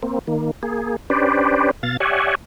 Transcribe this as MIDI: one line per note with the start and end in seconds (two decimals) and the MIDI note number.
0.03 0.19 58
0.03 0.19 60
0.27 0.51 51
0.27 0.51 58
0.63 0.96 58
0.63 0.96 68
1.10 1.71 61
1.10 1.71 62
1.10 1.71 67
1.10 1.71 71
1.10 1.71 72
1.10 1.71 74
1.83 1.97 47
1.83 1.97 77
1.83 1.97 93
2.00 2.35 67
2.00 2.35 73
2.00 2.35 74
2.00 2.35 76
2.00 2.35 78
2.00 2.35 80